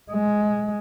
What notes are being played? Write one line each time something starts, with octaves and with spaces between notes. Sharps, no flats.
G#3